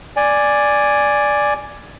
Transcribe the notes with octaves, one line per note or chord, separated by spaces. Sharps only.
D5 G#5